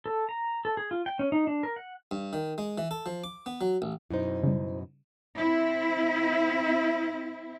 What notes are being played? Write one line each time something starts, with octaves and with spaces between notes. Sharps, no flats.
A4
A#5
A4
G#4
F4
G5
C#4
D#4
D4
A#4
F#5
G2
D#3
G#3
E3
A4
F3
D6
B3
F#3
A1
F#2 B2 D#4 E4 C5
C#3 G3
C4 E4